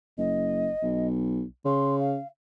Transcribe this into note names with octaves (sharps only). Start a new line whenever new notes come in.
F#1 D#5
B1
C#3 C6
F5